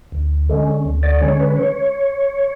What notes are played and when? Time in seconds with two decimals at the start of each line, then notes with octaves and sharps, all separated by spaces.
0.12 D2
0.49 D3 G#3 C#4
0.85 D2
1.03 D5
1.21 D3 G#3 C#4 C#5
1.40 B4
1.57 C#5